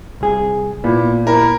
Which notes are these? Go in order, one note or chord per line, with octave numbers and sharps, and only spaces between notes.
C2 G#4
A#2 B3 E4
E4 A#4